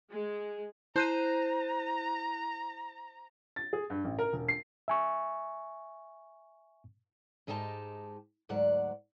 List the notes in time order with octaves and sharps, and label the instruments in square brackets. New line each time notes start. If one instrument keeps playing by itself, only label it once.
[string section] G#3
[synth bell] E4 F#6 D#7 [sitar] C5 [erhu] A#5
[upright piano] A6
G#4
G2
A1
A#4
E1
C7
[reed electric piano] E5 G#5 C#6
[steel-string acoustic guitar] G#2 G#3 D#4 G4 C#5 A5
D2 G#2 F#3 D5 F#5